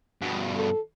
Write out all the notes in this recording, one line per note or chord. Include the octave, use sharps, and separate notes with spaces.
G2 B2
A4